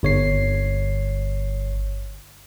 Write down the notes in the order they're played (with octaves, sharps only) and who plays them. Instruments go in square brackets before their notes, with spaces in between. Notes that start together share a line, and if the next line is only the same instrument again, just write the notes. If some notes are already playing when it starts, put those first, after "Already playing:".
[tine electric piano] G1 C#5 C7